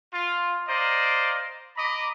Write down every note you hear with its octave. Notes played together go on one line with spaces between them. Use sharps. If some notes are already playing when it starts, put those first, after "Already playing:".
F4
C5 D5 D#5 F5 A#5
D#5 A#5 B5 D6